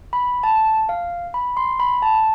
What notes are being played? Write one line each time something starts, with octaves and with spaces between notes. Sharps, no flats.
B5
A5
F5
B5
C6
B5
A5